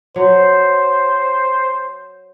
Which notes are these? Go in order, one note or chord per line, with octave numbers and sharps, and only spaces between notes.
F#3 C5